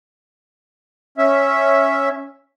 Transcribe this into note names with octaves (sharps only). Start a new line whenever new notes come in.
C#4 E5